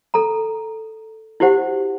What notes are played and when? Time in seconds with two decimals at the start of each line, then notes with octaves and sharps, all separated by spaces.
0.14 A4 A#5
1.40 E4 F#4 G4 C5 F#5